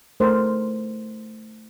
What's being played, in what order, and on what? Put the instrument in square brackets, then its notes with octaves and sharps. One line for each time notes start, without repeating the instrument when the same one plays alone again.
[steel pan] A3 A#4 C5